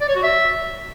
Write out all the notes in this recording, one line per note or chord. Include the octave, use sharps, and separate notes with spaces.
D5
C#5
F#4
E5